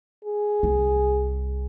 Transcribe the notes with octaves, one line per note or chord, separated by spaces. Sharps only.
G#4
C2 F4